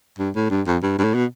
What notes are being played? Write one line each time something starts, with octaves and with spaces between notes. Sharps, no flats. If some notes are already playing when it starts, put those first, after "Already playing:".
G2
A2
G2
F2
G2
G2
A2
B2